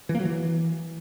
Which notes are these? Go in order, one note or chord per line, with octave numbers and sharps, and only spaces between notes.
E3
A#3
F#3
E3